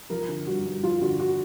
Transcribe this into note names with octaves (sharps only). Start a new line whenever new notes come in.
F3 A#4
D3
G2 F#4
G2
F3 F4
D3 F#4
F#4